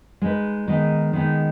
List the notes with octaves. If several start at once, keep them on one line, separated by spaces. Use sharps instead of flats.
G#3 D#4 B4
D#3 G#3 B3 D#4
D#3 G#3 B3 D#4